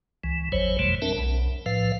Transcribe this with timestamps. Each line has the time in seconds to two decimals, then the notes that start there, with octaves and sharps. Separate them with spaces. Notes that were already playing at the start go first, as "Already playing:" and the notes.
0.24 C#2 E3
0.52 G#1 E2 F#3 C5 C#5
0.79 F2 B2 E3 G3 A3
1.02 C4 D4 A#4 E5 A5
1.18 B1
1.66 A2 F3 B4 F5